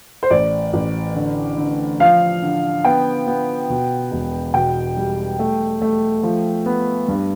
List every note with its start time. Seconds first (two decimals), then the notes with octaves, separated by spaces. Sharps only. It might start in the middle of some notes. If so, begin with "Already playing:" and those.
0.23 C5
0.30 A1 D5
0.73 A1
1.15 D3
1.57 D3
2.00 F3 F5
2.42 D3
2.84 B3 G5
3.27 B3
3.70 B2
4.12 E1
4.54 B2 G5
4.97 G3
5.39 A3
5.82 A3
6.23 F3
6.66 B3
7.08 G2